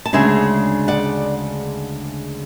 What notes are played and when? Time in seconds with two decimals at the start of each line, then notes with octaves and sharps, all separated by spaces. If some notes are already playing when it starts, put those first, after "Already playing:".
0.06 A5
0.13 D2 C#3 G#3 D4 E5 G#5
0.88 D5 F#5